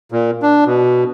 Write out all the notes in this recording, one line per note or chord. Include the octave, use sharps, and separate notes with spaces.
A#2
D4
B2